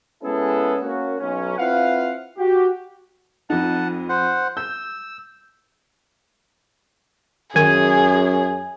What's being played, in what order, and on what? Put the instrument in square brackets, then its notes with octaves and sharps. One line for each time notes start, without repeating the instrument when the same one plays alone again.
[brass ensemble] G#3 B3 C#4 E4 G#4 A4
A#3 C#4 F#4
B1 C#4
C4 E4 F4 B4 F5 F#5
F#4 G4
[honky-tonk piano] F2 D#4 [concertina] F#5 A5
[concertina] C5 F#5
[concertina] E6 [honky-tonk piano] G6
[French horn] F#2 [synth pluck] D#3 [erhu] G#4 [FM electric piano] G#5